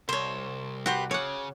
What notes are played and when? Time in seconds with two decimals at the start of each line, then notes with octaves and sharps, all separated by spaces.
0.09 C2 C5 C#5
0.86 F#4 G4 B4 C5
1.11 C#3 C#5 F#5 D6